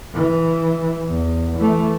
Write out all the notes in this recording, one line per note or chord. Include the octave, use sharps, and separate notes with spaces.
E3
E2
E3 A3